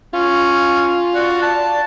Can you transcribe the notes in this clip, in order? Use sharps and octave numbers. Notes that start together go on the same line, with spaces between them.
C#4 F4
F#4 D5
A5